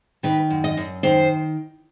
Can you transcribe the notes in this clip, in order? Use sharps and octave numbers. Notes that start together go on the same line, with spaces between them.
D#3 B4
F#2
D#5
F#2
D#3 C5